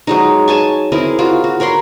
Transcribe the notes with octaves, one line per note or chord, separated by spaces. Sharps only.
F#3 G#3 D#4
C#5 G#5 A5 C#6
C4 E4 G#4 A#4
F4 F#4
F#4
A#4 C#5 B5 C6